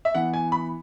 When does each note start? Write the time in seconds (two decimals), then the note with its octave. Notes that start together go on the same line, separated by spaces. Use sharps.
0.05 E5
0.15 E3 B3 F#5
0.34 G#5
0.52 B5